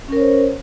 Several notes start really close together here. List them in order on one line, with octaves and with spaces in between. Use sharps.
C#4 A#4 C#5 C5